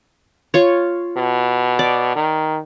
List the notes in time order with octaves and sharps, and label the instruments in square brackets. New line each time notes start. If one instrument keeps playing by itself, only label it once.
[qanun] F4 C#5
[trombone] B2
[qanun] D5
[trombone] D#3